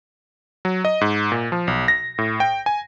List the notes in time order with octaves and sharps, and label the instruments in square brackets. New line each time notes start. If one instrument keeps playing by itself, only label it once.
[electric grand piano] F#3
D#5
G#2
A#2
F3
B1
A#6
A2
G5
G#5